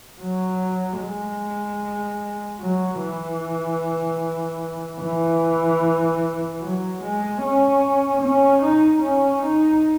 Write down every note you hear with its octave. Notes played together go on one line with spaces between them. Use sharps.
F#3
G#3
F#3
E3
E3
F#3
G#3
C#4
C#4
D#4
C#4
D#4